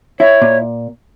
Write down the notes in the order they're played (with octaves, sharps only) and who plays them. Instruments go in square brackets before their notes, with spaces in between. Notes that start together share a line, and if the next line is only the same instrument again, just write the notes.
[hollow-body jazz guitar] E4 [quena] C#5
[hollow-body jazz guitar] A#2